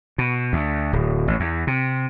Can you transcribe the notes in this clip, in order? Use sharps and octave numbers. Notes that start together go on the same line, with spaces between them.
B2
D2
D1
A1
E2
C3